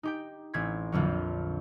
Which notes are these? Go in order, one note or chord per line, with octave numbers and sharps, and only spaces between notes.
D#4 G4 G5
A1 C4 G#6 B6
A#1 F2 D3 F#3